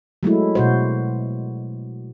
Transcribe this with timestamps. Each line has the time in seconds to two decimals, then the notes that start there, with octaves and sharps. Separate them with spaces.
0.23 F#3 G#3 A3 E4
0.55 B2 F#4 C5